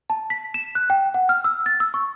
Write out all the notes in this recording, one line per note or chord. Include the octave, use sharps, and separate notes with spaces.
A5
B6
E7
F#6
G5
F#5
F6
E6
A6
E6
C#6